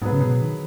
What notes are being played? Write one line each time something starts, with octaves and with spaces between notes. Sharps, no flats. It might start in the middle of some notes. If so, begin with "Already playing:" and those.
G#2 F#3 B3 G#4 B4
C#3
B2
D#3